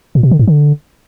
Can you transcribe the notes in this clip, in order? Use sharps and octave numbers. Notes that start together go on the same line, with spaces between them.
A#2
B2
D3
G#2
D3